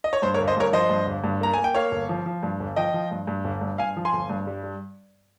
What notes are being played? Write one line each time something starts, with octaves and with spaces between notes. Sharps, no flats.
D#5
C#5
G2 C5
A#4 C#5
G1
C5 D#5
G2 A#4 C#5
F3 C5 D#5
G2
G1
G2
A#3 A#5
A#3 G#5
G5
A#3 C#5 F5
G1
F3
F3
G2
G1
F3 D#5 G5
F3
G2
G2
G1
G2
G2 F5 G#5
F3
G#5 C6
G1
G2
G3
G3